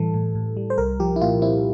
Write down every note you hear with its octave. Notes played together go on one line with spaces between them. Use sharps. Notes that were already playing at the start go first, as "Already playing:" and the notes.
Already playing: A2 E3 G3 A4
A2
A2
G3
C5
C2 A#4
F3 G4
E4
A#2 F4
C4 E4